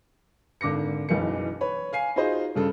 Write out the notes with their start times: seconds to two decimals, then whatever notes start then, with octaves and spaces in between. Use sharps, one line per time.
0.61 G#1 D3 D6 A#6 C#7
1.09 F#1 B1 E3 C#7
1.61 B4 C#5 B5
1.93 F5 G#5 C7
2.16 D#4 F4 F#4 G#4 C5 D#5
2.55 G2 C#3 A4